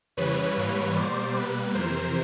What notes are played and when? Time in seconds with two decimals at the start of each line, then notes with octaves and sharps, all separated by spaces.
0.17 F2 C#3 E3 G3 B4 C#5
0.57 G#2 E3 G3 A#3
0.96 B2 G3 A#3 C5 D5
1.35 B2 G3 A#3 B4
1.75 F2 C3 E3 A#4 C5